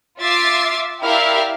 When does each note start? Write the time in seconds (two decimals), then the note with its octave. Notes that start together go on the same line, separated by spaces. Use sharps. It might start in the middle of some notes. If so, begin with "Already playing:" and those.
0.20 F4 E5 D6 A6 C7
1.01 E4 G4 A#4 D5 E5 F5